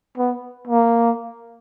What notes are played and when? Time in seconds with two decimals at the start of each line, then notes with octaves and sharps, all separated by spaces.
0.18 B3
0.67 A#3